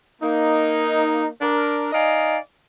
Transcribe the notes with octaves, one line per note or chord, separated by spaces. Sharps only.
A#3 D#4
D4 A#4
D#4 D5 D#5 F5 G#5